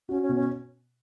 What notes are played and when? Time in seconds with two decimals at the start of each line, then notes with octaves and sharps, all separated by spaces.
0.09 C#4 F#4
0.22 C#4
0.29 B2
0.36 C#4